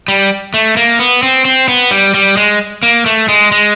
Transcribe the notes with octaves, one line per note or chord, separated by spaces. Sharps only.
G3
A3
A#3
B3
C4
C4
B3
G3
G3
G#3
A#3
A3
G#3
G#3